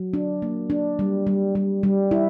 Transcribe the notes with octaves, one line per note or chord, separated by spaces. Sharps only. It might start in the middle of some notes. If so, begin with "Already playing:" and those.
Already playing: F#3
D4
A#3
D4
G3
G3
G3
G3
E4